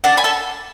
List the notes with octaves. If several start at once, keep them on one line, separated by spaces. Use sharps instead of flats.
D4 F#5 A5
G#5 B5
A4 A5